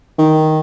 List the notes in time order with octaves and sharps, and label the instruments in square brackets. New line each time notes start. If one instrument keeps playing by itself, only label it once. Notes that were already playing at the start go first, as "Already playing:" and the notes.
[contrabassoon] D#3